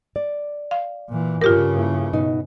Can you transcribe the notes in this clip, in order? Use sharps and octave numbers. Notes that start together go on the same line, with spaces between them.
D5
F5
A#2 E3
G2 C#3 F4 G4 A#4
A#3 E4
B2 D#4